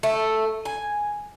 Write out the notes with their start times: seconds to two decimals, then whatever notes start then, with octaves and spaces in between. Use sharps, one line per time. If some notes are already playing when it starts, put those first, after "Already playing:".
0.03 A3
0.65 G#5